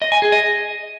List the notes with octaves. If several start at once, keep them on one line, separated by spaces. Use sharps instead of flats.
D#5
G#5
G#4
D#5